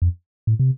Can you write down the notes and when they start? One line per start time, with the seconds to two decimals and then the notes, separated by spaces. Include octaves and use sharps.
0.02 F2
0.47 A2
0.59 C3